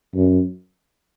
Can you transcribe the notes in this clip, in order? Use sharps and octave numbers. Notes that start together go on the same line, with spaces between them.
F#2